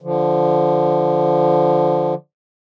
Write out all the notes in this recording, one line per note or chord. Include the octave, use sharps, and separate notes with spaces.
D3 F3